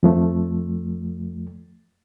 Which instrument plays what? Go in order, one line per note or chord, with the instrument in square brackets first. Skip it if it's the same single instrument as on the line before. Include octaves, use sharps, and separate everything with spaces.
[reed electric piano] F2 F3 A3